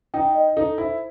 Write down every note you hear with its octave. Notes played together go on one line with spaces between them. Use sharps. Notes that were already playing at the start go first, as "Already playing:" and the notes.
D#4 G5
D#5
D#4 A4
E4 C5